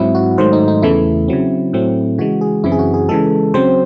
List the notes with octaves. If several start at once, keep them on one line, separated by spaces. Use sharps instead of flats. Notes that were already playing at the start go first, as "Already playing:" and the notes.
Already playing: G#2 F#3 C4 E4
F#4
G#2 D#3 F#3 A3 C5
D#4
D#4
E2 C#3 E3 A3 E4
C#3 F#3 C4
A2 F#3 A3 C4
C#3 E3 G#3 F#4
G#4
F#2 C#3 E3 C4 E4
G#4
F#4
G#4
C#3 E3 G#3 A4
C#3 F#3 C4 C5